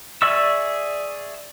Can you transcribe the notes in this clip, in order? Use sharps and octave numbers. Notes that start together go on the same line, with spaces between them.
G#4 D5 E5 C#6 E6